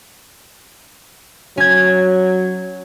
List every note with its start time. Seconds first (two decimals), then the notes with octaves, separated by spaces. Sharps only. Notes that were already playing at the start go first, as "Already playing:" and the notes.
1.57 F#3 C#4 G#6